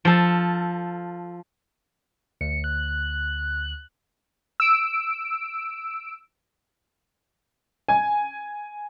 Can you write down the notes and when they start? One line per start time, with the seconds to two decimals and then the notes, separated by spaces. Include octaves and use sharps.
0.05 F3 A4
2.41 D2 C#7
2.64 F#6
4.60 E6 D7
7.89 G#5